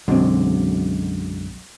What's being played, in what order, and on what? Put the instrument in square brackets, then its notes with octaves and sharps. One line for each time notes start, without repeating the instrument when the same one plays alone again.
[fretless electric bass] B1 C4 [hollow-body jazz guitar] F#2 D3 G#3